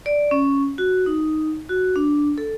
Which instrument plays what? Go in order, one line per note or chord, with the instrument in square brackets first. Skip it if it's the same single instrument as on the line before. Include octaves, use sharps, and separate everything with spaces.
[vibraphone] D5
C#4
F#4
D#4
F#4
D4
A4